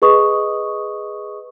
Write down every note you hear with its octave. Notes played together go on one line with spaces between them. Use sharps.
G#4 B4 D#5 C#6 D#6